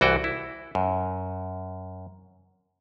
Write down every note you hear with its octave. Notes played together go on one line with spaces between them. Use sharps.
C2 E3 F#4 G5 A5
E4
F#2